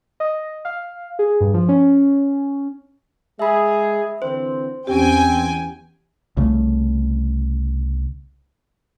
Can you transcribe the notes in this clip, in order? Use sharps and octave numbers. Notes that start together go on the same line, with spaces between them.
D#5
F5
G#4
G2
F3
C#4
G#3 G#4 E5 B5
D3 E3 C4 C5
E2 C4 C#4 G4 G5 G#5
C2 C#3 F3 A3